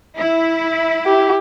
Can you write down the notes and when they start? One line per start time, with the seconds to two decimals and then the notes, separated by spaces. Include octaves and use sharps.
0.15 E4
1.06 G4